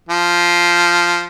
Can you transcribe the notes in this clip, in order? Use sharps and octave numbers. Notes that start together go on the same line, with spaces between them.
F3